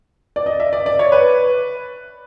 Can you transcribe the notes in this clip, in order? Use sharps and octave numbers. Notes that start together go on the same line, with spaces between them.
D5
D#5
E5
D5
D5
C#5
B4